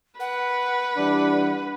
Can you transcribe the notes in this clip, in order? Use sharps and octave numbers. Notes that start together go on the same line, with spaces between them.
B4 F#5
E3 G3 D4